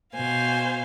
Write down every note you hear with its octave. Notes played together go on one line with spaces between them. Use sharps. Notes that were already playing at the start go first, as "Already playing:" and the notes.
B2 C5 F5 G#5